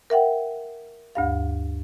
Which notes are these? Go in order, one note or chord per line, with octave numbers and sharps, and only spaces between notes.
A#4 E5 F#5 G5
D2 G2 F5